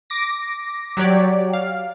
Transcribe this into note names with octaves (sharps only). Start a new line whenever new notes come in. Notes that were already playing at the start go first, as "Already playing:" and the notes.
D6 A#6
F#3 G4 C#5 D5
F5